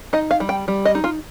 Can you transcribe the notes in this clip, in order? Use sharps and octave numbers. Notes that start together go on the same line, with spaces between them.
D#4 D#5
F5
G3
G5
G3
D#5
D#4
F4